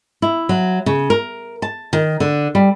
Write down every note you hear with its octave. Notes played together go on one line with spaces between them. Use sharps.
E4
F#3
C#3
A#4
A5
D#3
D3
G3